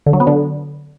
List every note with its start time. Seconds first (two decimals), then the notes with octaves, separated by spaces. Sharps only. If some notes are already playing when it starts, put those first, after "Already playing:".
0.06 D3
0.13 F#3
0.20 B3
0.27 D3